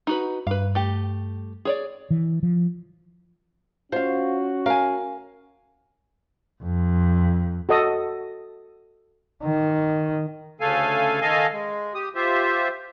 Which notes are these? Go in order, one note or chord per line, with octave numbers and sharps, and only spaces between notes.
D#4 F#4 B4
G2 B4 F5
A3 G4
G#4 C#5 D5
E3
F3
C#4 F4 F#4 C5 F5
A#4 F5 G#5
F2
F#4 A4 D#5 D#6
D#3
D2 C#3 A3 A4 F5 G#5
D#3 A4 D#5 F5 G#5
G#3
G4 D#6
F4 G4 C5 E5